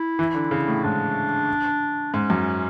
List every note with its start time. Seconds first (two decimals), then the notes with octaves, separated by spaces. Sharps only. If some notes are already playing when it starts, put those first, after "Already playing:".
Already playing: E4
0.19 E3
0.35 D3
0.51 C#3
0.68 A2
0.83 G#2 D4
2.13 G#2 C#4
2.30 F#2